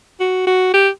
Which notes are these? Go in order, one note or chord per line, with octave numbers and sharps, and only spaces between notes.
F#4
F#4
G4